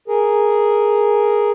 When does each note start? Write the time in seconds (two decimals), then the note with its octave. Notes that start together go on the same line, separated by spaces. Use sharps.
0.08 G#4 A#4